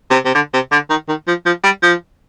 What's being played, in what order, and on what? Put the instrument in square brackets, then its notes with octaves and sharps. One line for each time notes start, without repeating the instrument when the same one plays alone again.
[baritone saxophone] C3
C3
D3
C3
D3
D#3
D#3
F3
F3
G3
F3